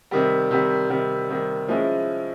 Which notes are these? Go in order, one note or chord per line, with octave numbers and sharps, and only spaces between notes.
C3 D#3 G3
C3 D#3 G3
C3 D#3 G3
C3 D#3 G3
F3 G#3 C#4 E4